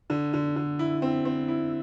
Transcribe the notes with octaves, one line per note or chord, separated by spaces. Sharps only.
D3
D3
D3
E4
C4
C4
E4